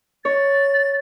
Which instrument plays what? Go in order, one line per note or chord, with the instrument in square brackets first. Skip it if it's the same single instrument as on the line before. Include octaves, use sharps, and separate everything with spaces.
[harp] C#5 [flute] A6